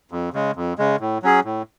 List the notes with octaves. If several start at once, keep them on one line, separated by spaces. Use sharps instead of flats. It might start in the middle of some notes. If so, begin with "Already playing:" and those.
F2
C#3 G#3
F2
C#3 G#3
A2
F#3 C#4 G#4
A2